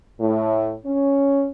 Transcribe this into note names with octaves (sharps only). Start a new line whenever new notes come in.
A2
C#4